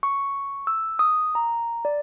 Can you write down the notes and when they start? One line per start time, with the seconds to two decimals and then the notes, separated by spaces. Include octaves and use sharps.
0.03 C#6
0.67 E6
0.99 D#6
1.35 A#5
1.85 D5